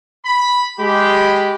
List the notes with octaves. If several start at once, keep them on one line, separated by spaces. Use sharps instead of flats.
B5
G#3 G4 B5